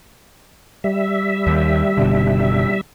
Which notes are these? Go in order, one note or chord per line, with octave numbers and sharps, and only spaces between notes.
G3 E5
D#2
F#1 B2 D3